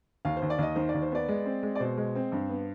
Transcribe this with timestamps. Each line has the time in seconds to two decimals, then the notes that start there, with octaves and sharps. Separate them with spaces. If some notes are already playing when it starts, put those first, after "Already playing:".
0.25 D#2 F5
0.37 C5
0.42 D#2
0.50 D5
0.58 D#2 D#5
0.76 D#3 C5
0.89 D5
0.94 D#2
1.02 C5
1.11 B3 D5
1.28 G#3
1.45 C4
1.63 G#3
1.75 D5
1.80 B2 C5
1.97 G#3
2.15 C4
2.32 G2
2.49 B3